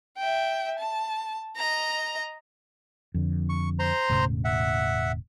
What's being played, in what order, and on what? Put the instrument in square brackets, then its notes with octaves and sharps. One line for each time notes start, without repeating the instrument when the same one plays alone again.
[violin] E5 G5
A5
D#5 A#5
[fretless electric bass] F2 D3
[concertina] C#6
C5 A#5 C6
[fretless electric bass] E1 A2 C#3
[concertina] E5 F#5